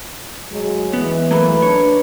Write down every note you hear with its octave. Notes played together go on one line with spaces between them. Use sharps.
F#3 G#3
E3 B3
F#3 A3 A#3 A#4 B4
D4 C#5